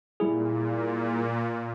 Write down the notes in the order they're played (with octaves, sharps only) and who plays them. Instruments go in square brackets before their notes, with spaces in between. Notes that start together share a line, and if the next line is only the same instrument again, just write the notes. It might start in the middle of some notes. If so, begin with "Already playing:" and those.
[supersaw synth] A#2 [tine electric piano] G3 E4 G#4